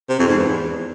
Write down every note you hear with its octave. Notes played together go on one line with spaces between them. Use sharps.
C3
F2
G#2
E2